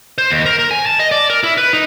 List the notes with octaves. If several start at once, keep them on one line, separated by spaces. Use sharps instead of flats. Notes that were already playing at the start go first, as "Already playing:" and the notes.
C5
D#2
A#4
A#4
G#5
A5
D#5
D5
A#4
E4
B4
D#4